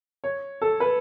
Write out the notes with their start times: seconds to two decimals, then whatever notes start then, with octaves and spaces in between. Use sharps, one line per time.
0.24 C#5
0.62 A4
0.80 B4